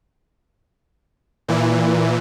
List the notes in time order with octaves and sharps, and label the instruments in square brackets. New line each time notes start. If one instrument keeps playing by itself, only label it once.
[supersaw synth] A#2 E3